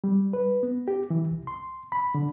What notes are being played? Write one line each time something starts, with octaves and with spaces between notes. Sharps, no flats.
G3
B4
B3
G4
E3
C2
C6
B5
D3